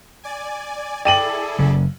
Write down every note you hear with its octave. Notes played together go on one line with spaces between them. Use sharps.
D5 G#5
E4 G#4 A4 D5 G5 D#7 F#7
F#1 C#3